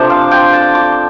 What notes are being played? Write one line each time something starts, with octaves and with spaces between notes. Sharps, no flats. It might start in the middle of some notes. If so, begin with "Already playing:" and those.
Already playing: C3 F3 D4 A4 C5
F5
G5
A5
D6